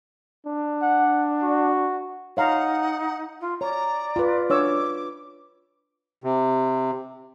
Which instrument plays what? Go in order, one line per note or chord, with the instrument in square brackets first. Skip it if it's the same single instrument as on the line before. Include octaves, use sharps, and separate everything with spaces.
[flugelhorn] D4
[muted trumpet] F#5
F#4
[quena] D#4 [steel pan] C#5 F5 A#5 [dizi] F#5
[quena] F4
[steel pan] C#5 [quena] D5 [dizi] A#5
[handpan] F4 B4
[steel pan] D4 C#5 E6 [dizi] D6
[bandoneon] C3